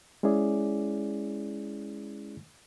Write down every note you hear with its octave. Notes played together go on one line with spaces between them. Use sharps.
G#3 C#4 E4 G#4 D5